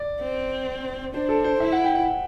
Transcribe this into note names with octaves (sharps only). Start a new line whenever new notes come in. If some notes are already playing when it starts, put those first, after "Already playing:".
Already playing: D5
C4
D4 C5
A4
C5
E4 E5
F#5
G5
F#5